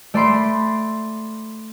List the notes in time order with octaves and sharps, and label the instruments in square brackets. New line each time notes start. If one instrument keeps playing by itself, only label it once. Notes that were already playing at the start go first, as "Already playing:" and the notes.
[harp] A3 D5 B5 C6 C7 D7